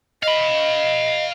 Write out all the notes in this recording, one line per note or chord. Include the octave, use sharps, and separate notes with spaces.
D#5 F5 B5